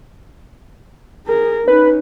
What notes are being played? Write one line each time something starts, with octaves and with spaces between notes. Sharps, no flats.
G#4 A#4
C#4 D#4 B4